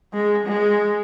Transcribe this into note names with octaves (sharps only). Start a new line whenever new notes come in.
G#3
G#3